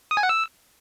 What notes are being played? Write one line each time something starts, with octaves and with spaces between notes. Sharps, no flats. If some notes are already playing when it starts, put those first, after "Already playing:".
D#6
G#5
F#5
E6